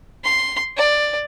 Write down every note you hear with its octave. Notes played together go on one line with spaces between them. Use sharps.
C6
D5